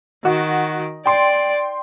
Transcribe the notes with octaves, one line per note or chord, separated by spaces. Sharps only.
D#3 F#4
D5 G5 C6